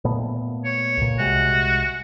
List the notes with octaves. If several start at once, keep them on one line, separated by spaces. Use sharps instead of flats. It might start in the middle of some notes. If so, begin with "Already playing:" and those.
A#2 A3 B3
C#5
C#2 A#2
C2 C3 G#3 F#4